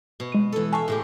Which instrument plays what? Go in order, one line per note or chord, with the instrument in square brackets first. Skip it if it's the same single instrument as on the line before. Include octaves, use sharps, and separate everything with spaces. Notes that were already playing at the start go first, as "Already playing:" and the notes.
[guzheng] B2
[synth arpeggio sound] G#3 D#7
[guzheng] E3 A4
[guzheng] E5 F5 [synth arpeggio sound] G#5 A5 C#6
[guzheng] A2 G#3 G4